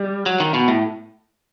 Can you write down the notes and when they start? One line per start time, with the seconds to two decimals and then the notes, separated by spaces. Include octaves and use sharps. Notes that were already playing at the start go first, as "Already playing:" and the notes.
Already playing: G3
0.26 F#3
0.40 D#3
0.54 B2
0.68 A2